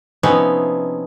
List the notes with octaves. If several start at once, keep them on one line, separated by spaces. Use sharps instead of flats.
C3 F3 B3 C#4 D#4 E4